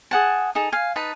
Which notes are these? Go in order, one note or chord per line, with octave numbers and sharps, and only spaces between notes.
G#4 F#5 A5
D#4 G#4 A4
F5 G#5
D#4 B4 A5